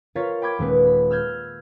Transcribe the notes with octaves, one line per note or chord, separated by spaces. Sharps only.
F4 A#4 C#5 F5 A6 B6
G5 B5 D6 G#6
D#1 G#3 B4
B5
E6 F6 G6 G#6